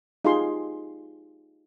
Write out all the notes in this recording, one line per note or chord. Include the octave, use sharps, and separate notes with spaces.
D#4 F4 G4 G#4 C6